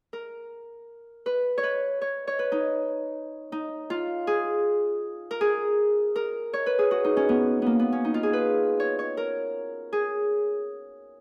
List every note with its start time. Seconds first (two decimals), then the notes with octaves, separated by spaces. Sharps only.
0.13 A#4
1.26 B4
1.58 C#5
1.63 B4
2.01 C#5
2.27 C#5
2.39 B4
2.52 D#4
3.52 D#4
3.90 F4
4.27 G#4
5.31 A#4
5.41 G#4
6.16 A#4
6.53 C#5
6.66 B4
6.79 G#4
6.91 F#4
7.04 D#4
7.17 C#4
7.29 B3
7.62 A#3 B3
7.79 B3
7.92 C#4
8.05 D#4
8.14 F4
8.23 G#4
8.33 B4
8.80 C#5
8.99 C#5
9.17 A#4
9.93 G#4